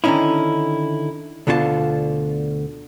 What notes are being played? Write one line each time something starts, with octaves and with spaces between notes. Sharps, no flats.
D3 D#3 G3 C#4 D#4 E4
D2 B2 D3 F4 G#4 A5